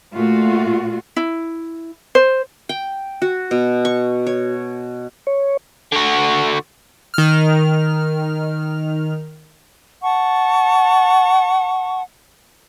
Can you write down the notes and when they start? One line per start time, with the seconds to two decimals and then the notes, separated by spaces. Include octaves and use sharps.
0.14 A#2 A3 F4 F#4
1.16 E4
2.15 C5
2.69 G5
3.22 F#4
3.51 B2
3.85 C#6
4.27 C#5
5.27 C#5
5.92 D3 F#4
7.14 D#3 F6
10.02 F#5 A5 C#6